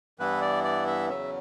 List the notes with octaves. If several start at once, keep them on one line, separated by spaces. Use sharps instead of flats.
G2 E3 B3 E4 B4
D5
D5
E5
E2 C#3 F#3 C#4 E5